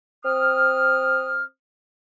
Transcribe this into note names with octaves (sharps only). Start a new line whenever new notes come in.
C4 D#6 F6